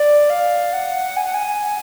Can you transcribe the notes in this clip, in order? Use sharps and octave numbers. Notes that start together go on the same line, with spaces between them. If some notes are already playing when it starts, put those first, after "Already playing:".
Already playing: D5
F5
F#5
G#5
F#5
G#5